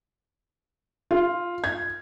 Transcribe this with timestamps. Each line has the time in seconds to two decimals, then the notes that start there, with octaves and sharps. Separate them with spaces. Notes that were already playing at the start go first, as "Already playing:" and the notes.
1.11 F4
1.64 G#6